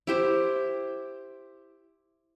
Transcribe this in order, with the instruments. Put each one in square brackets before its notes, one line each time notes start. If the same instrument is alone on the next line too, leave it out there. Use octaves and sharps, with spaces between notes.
[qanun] E4 G4 C5